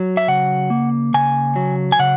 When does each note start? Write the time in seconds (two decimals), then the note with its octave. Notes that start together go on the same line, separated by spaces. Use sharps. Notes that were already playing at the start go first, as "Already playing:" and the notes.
Already playing: F#3
0.17 E5
0.28 C#3 F#5
0.70 A#3
1.14 C#3 G#5
1.56 F#3
1.92 G#5
1.99 C#3 F#5